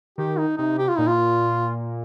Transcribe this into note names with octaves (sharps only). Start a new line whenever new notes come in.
D#3 G4
D#4
C3 D#4
G4
F4
A#2 D#4
F4